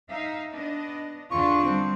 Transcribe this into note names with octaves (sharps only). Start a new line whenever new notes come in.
D#4 E5 F5
B3 D4 D#5
E2 D3 D4 F4 C#6
G3 C4